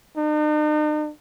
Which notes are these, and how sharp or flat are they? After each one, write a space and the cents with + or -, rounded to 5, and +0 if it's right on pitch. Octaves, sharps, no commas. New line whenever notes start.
D#4 -45